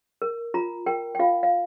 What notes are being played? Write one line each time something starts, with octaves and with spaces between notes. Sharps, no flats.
A#4
F4 A#5
A#4 G5
G5
F4 F5
F5